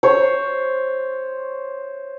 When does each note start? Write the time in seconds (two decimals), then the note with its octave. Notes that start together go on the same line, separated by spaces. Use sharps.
0.03 C5 C#5